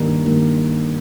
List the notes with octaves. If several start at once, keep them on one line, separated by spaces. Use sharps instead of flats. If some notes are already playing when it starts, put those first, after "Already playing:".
Already playing: G2 D#3 A#3
G2 D#3 A#3